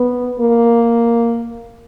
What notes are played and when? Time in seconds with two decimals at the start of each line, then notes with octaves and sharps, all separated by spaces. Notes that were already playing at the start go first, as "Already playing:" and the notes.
Already playing: B3
0.40 A#3